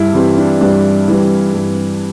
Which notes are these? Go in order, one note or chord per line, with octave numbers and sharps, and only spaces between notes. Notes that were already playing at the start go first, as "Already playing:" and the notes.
Already playing: G2 E4
E3 G3 C4
D4
G2 D4
E3 G3
G2